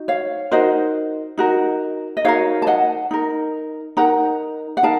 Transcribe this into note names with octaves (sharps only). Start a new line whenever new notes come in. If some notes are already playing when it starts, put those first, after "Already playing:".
Already playing: D#4 F#4
C#5 F5
D#4 F#4 A#4 C5 D#5
D#4 F#4 A#4
D#5
D#4 F#4 A#4 C#5 F5
A5
D#5 F#5
D#4 A#4
D#4 A#4 F#5 A#5
F#5
D#4 A#4 F5 A5